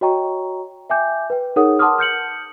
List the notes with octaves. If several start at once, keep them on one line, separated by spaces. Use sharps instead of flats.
F#4 C#5 D#5 G5 A#5 C#6
E5 G5 G#5 D6 G6
B4 G5
D#4 G#4 A#4 C#5 F#5 D#6
F#5 A5 C6 D6 D#6 F6
F6 G6 C#7 F#7